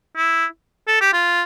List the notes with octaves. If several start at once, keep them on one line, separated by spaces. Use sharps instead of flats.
E4
A4
G4
F4